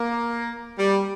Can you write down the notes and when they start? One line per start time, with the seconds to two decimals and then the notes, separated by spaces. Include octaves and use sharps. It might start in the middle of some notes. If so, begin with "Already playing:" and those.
Already playing: A#3
0.79 G3